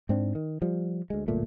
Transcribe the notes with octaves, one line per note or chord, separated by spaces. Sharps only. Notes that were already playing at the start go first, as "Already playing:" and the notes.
G#2 C4 D4
D#3
F3 G3
D2 G#3
D1 G1 A#2 A3